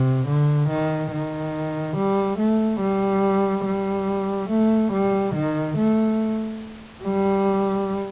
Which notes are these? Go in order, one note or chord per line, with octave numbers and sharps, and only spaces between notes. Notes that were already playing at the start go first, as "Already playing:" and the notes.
Already playing: C3
D3
D#3
D#3
G3
A3
G3
G3
A3
G3
D#3
A3
G3